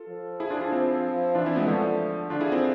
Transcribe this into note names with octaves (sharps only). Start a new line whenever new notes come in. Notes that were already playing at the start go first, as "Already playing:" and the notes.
Already playing: F4 A4
F3
E4 G#4
D4 F4
G#4
D4 F4
C4 E4
E3 D4 F4
C4 E4
G#3 B3
D3 F3 A3
D3 D4 F4
E4 G#4
C4 E4